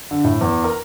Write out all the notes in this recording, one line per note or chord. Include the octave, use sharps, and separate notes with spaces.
D3
A2
E2
A#4